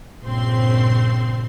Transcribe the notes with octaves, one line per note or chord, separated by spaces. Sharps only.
A#1 G2 C#3 C4 C6